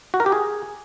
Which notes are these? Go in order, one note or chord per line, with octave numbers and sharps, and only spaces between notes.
F#4
A#4
G4
G#4